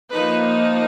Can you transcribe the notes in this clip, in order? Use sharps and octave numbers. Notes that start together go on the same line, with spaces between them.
F3 A#3 D#4 B4